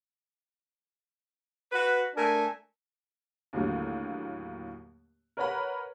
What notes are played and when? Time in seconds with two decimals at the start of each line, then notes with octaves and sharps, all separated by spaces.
1.72 F#4 B4
2.15 A3 D4 A#4 G#5
3.53 D#2 A2 D3 F#3 A#3
5.37 A#4 B4 C#5 F#5 A#5 B5